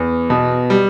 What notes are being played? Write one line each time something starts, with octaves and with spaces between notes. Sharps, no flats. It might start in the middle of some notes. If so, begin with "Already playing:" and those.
Already playing: E2
B2
G3